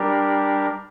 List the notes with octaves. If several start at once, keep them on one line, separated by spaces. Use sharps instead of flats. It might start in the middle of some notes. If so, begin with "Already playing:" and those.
Already playing: G3 D4 G4 A#4